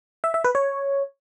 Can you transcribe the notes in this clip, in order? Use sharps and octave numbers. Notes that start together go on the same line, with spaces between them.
E5
E5
B4
C#5